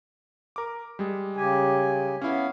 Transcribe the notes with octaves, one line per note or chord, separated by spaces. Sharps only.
A#4 D6
G3 G#3
C#3 G4 G#5
B3 C#4 E4 F5